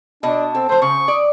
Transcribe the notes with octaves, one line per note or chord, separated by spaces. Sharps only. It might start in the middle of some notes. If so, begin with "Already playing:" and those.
B2 D4 D#5 A5
C4 A4
F3 A3 C5
C#3 C#6
D5 D#6